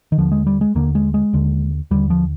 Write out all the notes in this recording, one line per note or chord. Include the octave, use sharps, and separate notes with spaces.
D#3
D#2 D3 F3
G#3
G3
G#3
D#2 D3 A#3
G#3
G#3
D#2 D3
D#2 D3 G3
F3